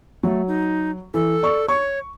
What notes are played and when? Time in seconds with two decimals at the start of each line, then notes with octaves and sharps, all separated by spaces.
0.23 F#3 A3
0.48 D#4
1.14 E3 A4
1.43 D5 C#6
1.68 C#5 C#6